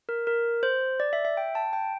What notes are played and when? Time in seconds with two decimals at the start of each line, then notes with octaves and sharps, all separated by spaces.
0.09 A#4
0.27 A#4
0.63 C5
1.00 D5
1.13 E5
1.25 E5
1.37 G5
1.55 A5
1.73 G5